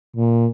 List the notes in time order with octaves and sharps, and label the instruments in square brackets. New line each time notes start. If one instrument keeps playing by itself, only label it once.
[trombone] A#2